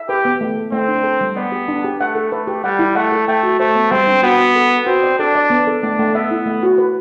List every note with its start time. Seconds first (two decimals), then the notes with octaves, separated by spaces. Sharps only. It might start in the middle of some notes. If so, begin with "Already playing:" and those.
Already playing: E5
0.09 G4 B4
0.25 B3
0.41 A3
0.56 A4
0.72 A3 C4
0.88 D4
1.04 A4
1.21 G3
1.37 B3 D5
1.52 G4
1.68 D4
1.84 G4
2.01 A3 F#5
2.15 A4
2.32 A3 B4
2.47 G4
2.64 G3 F#5
2.79 E4
2.95 A3 F#5
3.12 A4
3.28 A3 G5
3.43 F#4
3.60 A3 C5
3.75 B3
3.91 G3 C4
4.07 D4
4.23 B3 F#4
4.40 F#4
4.56 A4
4.70 A4
4.86 C4 F#4
5.03 D5
5.19 D4 A4
5.35 D5
5.50 B3
5.67 A4
5.82 A3 D4
5.99 A3
6.14 B3 E5
6.31 E4
6.46 A3
6.63 F#4
6.78 B4